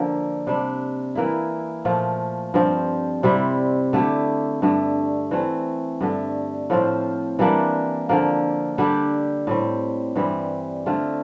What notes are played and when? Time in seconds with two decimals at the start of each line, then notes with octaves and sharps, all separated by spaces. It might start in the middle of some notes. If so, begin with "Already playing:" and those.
Already playing: D3 F3 A#3
0.47 C3 G3 D4
1.15 E3 A#3 E4
1.85 A#2 F3 A3
2.54 G2 F3 C4
3.23 C3 G3 C4 E4
3.93 D3 A3 E4 G4
4.62 G2 D3 A3
5.31 E3 A3 C4
6.01 G2 D3 A3
6.70 A2 F3 C4 F4
7.39 E3 G3 A#3 D4
8.09 D3 F3 A#3
8.78 D3 G3 D4 G4
9.47 A2 G3 C4
10.16 G2 E3 G3 C4
10.86 D3 A3 C4 F4